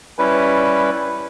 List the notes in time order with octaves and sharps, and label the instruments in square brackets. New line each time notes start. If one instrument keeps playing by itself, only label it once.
[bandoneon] G3 C#4 E4 B4